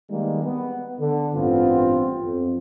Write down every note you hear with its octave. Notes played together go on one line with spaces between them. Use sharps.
D#3 G3 G#3 A#3 B3 D#4
B3
D3
A1 G2 B3 C4 F4
F2